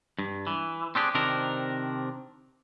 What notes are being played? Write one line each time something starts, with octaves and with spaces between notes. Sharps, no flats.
G2
E3
C4 D4 G4 G#4
C3 D#3 C4 D4 A#4